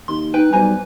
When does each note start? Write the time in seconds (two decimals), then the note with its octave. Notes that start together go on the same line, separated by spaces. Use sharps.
0.08 D#2 C6
0.34 D#4 B4 G5
0.53 B1 G3 C5 G#5 A#5